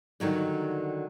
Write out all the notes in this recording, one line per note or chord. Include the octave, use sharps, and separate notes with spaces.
D3 D#3 F#3 G3